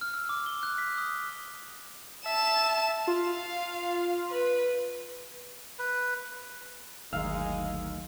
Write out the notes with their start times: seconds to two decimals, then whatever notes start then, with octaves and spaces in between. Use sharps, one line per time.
0.01 F6
0.14 E6
0.29 D6
0.46 G7
0.63 F#6
0.78 B6
0.98 D#6
2.26 E5 A5 E7
3.07 F4 F5
4.30 B4
5.79 B4
7.13 G1 D2 D#3 F#3 G#3 D#4 F5 E6